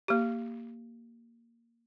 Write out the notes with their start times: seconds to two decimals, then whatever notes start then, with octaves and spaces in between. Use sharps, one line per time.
0.08 A#3 G4